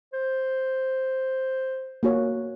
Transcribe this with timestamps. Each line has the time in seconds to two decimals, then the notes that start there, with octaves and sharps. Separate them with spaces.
0.13 C5
2.03 A#3 F#4 C#5